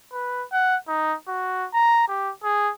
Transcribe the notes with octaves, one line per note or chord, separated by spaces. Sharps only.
B4
F#5
D#4
F#4
A#5
G4
G#4